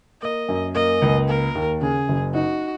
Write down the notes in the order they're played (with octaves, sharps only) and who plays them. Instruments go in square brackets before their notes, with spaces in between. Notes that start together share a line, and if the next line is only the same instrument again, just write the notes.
[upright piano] A#3 [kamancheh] D#5
[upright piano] F#2
[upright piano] A#3 [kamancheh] D#5
[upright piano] C#2
[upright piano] A#3 [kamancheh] A#4
[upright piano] D#2
[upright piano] C#3 [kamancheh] G#4
[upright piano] F#1
[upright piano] D#4 [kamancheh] F#4